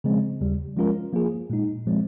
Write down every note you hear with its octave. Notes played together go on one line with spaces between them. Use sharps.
C#3 F3 G#3 C4
D#2 C#3 G3
F3 G#3 C#4 F4 A#4
F3 A#3 F4 G#4
A#2 G#3 D#4
A#2 F3 G#3 C4